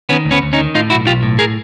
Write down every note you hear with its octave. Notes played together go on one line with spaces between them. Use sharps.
D#3 B3 C#4
D2
B3 C#4
D2
C#4 D#4
D#3
A2 D#4 F4
B1 E4 F#4
B1 F4 G4
A2
G#4 A#4